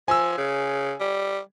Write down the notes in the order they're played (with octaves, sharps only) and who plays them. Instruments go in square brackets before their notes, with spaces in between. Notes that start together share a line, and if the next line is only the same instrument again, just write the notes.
[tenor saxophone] F3 [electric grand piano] G#5 E6
[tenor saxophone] C#3
G3